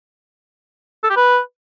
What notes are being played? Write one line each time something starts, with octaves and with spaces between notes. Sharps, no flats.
A4
G4
B4